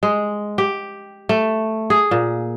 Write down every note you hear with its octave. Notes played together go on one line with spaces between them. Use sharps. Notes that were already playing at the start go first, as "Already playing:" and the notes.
G#3
G4
A3
G#4
A#2